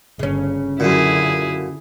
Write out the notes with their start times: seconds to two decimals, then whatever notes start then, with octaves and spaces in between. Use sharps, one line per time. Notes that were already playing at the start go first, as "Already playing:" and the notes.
0.19 G1 C#3 C#4
0.80 F#2 A#2 D3 E4 G#4